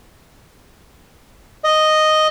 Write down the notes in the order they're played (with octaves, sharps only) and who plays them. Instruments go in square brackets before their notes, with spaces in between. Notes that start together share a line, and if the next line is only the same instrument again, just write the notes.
[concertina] D#5